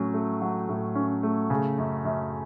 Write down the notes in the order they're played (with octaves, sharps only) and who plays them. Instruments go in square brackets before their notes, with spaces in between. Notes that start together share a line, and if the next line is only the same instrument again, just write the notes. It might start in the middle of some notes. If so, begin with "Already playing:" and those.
Already playing: [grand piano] A2 F#3 C#4
A3
F#3
A2
C#4
A3
C#3
F#2
F#2